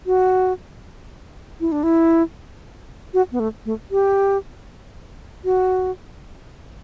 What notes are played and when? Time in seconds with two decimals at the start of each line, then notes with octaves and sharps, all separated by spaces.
0.06 F#4
1.60 E4
1.72 D4
1.83 E4
3.14 F#4
3.32 B3
3.40 A3
3.65 A3
3.91 G4
5.45 F#4